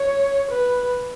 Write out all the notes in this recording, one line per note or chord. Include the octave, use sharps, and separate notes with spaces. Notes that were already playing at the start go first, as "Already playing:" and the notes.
Already playing: C#5
B4